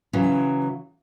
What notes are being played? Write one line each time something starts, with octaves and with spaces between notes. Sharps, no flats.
C#3 E3 F#3